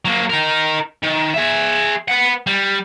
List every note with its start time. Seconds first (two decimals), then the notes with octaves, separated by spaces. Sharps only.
0.05 F#3 A#3
0.29 D#4 A#4
1.03 D#3
1.34 G#4 E5
2.08 B4 F#5
2.46 G3